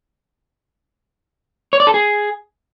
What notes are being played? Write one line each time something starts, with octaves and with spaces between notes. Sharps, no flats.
C#5
D5
A4
G#4